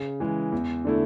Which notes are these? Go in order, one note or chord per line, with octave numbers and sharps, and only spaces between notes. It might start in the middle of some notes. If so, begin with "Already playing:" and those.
Already playing: C#3
E3 G#3
E2
D3 A3 E4